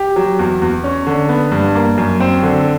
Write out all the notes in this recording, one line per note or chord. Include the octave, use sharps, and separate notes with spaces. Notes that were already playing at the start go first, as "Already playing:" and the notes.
Already playing: G4
F#3
E2
E2
C#4
D3
B3
G2
A#3
F#2
C4
D3